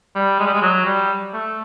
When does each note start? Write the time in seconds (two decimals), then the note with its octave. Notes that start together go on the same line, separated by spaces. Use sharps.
0.15 G3
0.40 G#3
0.46 G3
0.54 G#3
0.62 F#3
0.86 G3
1.33 A3